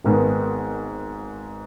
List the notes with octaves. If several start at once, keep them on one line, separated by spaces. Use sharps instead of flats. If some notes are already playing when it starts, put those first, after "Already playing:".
G#1 G#2 D#3 G#3 B3